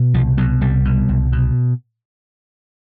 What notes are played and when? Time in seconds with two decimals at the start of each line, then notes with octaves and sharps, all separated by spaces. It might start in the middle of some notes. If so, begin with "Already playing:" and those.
Already playing: B2
0.14 C2 F3
0.38 B2 F#3
0.61 C2 G3
0.85 B2
1.09 C2
1.32 B2